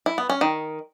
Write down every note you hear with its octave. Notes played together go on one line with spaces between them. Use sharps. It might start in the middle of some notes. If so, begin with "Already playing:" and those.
E4
B3
C#4
D#3